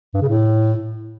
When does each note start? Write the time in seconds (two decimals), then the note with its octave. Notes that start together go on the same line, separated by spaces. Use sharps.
0.14 G2
0.21 C#3
0.29 A2